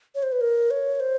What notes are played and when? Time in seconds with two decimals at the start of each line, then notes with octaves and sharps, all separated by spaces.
0.15 C#5
0.23 C5
0.32 B4
0.41 A#4
0.71 C#5
1.00 C5